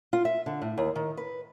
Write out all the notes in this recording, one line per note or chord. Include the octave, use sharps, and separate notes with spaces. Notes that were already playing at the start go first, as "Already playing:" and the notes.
F4
E5
D3
A2
D#2
D#3
B4